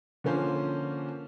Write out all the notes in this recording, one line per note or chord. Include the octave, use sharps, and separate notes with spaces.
D3 F3 A#3 C#4 F4 C5